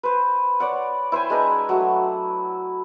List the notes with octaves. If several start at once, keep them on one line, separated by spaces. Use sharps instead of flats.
B4 C5
C#5 D5 F#5
E4 C5 G5 G#5
G#3 D4 B4 A#5
F#3 A3